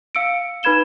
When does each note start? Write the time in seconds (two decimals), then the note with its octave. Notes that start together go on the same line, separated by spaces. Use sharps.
0.15 F5 E6 C#7 D7
0.63 D#4 B4 B5 G#6 E7 G7